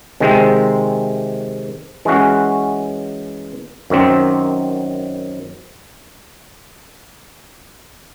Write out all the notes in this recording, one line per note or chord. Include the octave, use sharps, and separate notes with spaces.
C3 D#3 G#3 C4
E3 G#3 C#4 F#4
F#2 D#3 F#3 C4